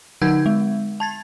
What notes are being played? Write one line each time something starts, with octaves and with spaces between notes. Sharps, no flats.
D3 D#4 F#5 E6 G6 G#6
G#3
A5 G#6 A6